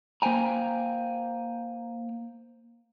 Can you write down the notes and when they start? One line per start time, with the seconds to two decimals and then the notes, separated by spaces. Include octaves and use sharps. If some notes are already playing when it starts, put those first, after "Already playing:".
0.22 A#3 C5 G5 G#5 A#5